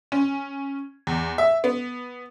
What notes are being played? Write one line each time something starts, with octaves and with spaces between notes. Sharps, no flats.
C#4
E2
E5
B3